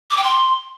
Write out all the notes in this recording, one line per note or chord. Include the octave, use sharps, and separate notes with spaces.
D6
G5
C6